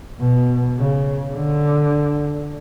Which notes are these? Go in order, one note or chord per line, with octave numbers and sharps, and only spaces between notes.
B2
C#3
D3